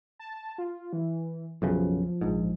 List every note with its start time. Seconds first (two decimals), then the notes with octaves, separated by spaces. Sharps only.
0.19 A5
0.58 F4
0.93 E3
1.62 B1 F#2 C#3 F3
2.21 A#1 G#2